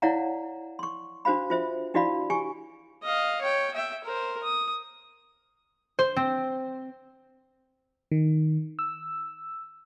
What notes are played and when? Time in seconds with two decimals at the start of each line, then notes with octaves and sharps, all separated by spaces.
0.02 E4 C#5 D5 F5 F#5 A#5
0.79 C6 C#6
1.25 D4 F#4 C5 F5 B5
1.50 F4 C5 E5
1.94 D4 E4 F#4 D5 F5 B5
2.30 G4 G#5 C#6
3.03 D#5 F5
3.41 C#5 G5
3.74 E5 G5
4.04 A#4 C5
4.43 D#6
5.99 C5
6.16 C4
8.12 D#3
8.79 E6